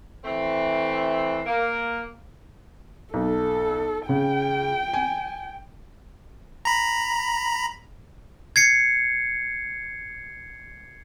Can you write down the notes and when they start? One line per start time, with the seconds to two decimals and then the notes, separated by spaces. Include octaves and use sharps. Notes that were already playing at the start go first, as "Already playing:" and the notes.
0.24 E3 A3 C4
1.46 A#3
3.14 B1 A4
4.09 C#3 G5
4.93 G#5
6.65 A#5 B5
8.56 G#6 C7 C#7